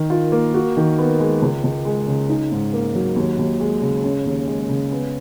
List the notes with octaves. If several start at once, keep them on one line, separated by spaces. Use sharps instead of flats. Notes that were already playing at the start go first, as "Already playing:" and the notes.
Already playing: D#3 A#4
F4
A#3
F#4
D#3
B3
G#3
C#2
C#2
G#3
C#3
D#4
G#2
A#3
F#3
D#2
D#2
G#3
C#3
C#4
D#2
G#3
C#3
B3